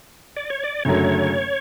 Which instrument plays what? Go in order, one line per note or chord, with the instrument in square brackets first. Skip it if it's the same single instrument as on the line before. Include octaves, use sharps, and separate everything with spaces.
[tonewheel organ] D5
C#5
D5
[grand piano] F#1 F#2 D3 F#3 A3 [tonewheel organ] C#5